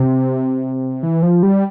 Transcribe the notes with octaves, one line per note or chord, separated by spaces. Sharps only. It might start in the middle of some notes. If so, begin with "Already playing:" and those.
Already playing: C3
E3
F3
G3